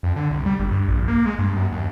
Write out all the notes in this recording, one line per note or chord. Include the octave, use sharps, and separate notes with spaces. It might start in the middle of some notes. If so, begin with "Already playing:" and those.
F2
D3
C2
G3
G1
G2
A#1
A#3
G#3
G2
F#2
D#2